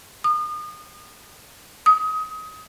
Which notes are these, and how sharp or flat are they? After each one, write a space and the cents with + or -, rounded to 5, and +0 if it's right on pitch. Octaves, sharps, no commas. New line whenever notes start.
D#6 -35
D#6 +25